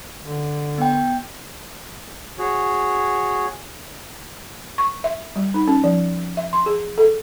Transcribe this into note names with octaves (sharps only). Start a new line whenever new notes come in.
D3
B3 G5
F#4 G#4 C#5
C#6
E5
G3
D#4
C#4
F3
E5
C6
G#4
A4